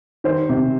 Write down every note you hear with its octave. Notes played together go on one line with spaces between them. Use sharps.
D#3 C5
C3